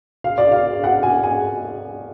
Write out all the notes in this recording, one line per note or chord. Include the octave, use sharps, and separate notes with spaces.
F5
D5
F5
F#5
G#5
G#5